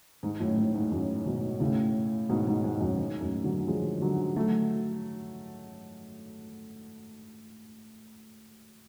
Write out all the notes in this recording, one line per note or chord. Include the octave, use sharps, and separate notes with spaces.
G#2
F#2 A2
G#2
G#2
F#2 A2
G#2 B2
A2 C#3
G#2 B2
G#2
G#2
F#2
G#2
F#2 A2
D3 F#3
F3 G#3
D3 F#3
F#3 A3